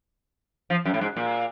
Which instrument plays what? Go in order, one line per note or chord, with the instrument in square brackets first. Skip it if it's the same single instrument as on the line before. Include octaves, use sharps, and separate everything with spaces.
[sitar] F3
F#2
A2
G#2
A#2